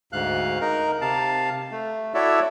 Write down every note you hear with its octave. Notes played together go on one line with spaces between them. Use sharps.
D2 G#2 F5 F#6
D#4 A#4
C3 F5 A5
A3
E4 F#4 A4 C#5 D5 E5